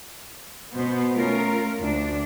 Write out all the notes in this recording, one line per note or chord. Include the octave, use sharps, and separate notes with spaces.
B2 B3 C5
A3 C#4 F4 A#4
D2 D4